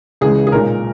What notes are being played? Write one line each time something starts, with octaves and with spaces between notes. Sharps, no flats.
C#2 C#3 E3 G#3 G#4
G#4
B1 A#2 G#3 A#4